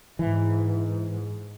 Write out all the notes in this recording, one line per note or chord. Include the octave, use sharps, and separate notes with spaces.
G#2 E3